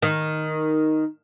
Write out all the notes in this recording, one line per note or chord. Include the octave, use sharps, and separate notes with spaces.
D#3